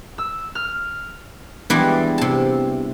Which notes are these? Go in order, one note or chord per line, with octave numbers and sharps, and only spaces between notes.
E6
F6
E3 G3 G#3 B3 D4
C3 A5